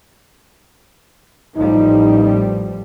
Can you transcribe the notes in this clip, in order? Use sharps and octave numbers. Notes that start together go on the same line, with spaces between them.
A1 F3 G3 D#4